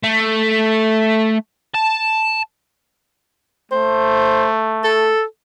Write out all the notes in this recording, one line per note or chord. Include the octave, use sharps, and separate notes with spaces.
A3
A5
A3 C5
A4